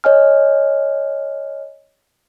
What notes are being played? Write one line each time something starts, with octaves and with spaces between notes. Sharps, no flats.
C#5 D#5 G#5 F6